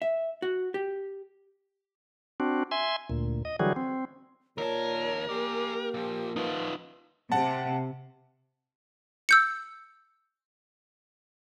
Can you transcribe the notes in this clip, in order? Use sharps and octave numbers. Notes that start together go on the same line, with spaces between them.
E5
F#4
G4
C4 D4 F#4
E5 G#5 C6
D2 A#2
D#5
D3 E3 F#3 G3 F#4 G#4
C4
D#2 A#2 A#4 C#5 A5
A#3 G4 G#4 D5
A#2 F3
F3 D#4 F4 B4
C3 F#5 A5
E6 G6 C#7